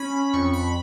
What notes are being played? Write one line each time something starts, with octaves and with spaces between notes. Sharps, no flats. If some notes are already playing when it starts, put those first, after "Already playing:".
Already playing: C#4 B5
F2 C#6
B5